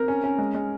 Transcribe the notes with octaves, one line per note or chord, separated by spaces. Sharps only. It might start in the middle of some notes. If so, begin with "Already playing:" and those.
Already playing: C4 A#4
C#4
C#4
G#3
G#3